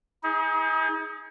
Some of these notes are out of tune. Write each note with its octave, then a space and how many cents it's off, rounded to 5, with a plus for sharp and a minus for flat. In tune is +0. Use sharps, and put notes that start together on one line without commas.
D#4 +40 G#4 -5